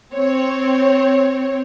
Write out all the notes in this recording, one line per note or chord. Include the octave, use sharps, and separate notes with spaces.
C4 C#5